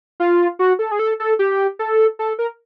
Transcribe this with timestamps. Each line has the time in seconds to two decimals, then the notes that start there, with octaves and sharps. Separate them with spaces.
0.20 F4
0.59 F#4
0.79 A4
0.91 G#4
0.99 A4
1.20 A4
1.39 G4
1.79 A4
2.19 A4
2.39 A#4